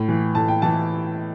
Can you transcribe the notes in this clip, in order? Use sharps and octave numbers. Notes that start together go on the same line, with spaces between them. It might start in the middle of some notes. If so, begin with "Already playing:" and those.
Already playing: A2
E3
A2 A5
G5
E3 A5